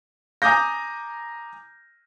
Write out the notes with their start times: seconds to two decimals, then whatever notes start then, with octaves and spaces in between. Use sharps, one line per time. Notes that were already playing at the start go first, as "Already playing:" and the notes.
0.42 G#5 A#5 D6 D#6 G6 A#6